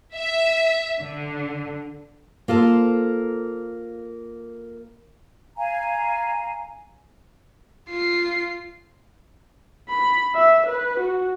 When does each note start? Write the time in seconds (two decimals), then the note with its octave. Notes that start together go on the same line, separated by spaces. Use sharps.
0.14 E5
0.98 D3
2.48 A#3 F4 A4 C5
5.57 F5 G#5 A#5
7.90 F4 C7
9.89 B5
10.35 E5
10.66 B4
11.00 F#4